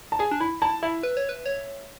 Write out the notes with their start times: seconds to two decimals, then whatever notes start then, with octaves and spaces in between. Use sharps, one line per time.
0.12 A5
0.19 G#4 G#5
0.31 D4
0.41 E4 B5
0.62 E4 A5
0.83 E4 E5
1.03 B4
1.17 C#5
1.29 B4
1.46 C#5